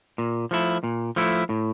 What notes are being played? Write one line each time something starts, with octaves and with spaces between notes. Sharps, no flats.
A#2
F3 A3 E4
A#2
F3 A3 E4
A2